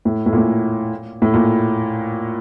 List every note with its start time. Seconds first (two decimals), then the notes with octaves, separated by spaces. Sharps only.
0.05 A2
0.26 A2
0.33 A#2
0.38 A2
1.22 A2
1.34 A#2